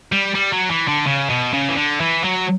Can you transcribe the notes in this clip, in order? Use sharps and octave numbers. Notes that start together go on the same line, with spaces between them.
G3
G3
F#3
E3
D3
C#3
B2
C#3
E3
D3
E3
F#3